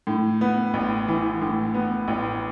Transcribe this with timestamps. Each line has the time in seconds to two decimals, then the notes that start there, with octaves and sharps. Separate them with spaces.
0.07 A2
0.41 B3
0.74 A1
1.08 E3
1.41 A2
1.74 B3
2.08 A1